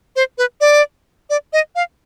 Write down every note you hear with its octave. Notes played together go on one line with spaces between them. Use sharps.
C5
B4
D5
D5
D#5
F5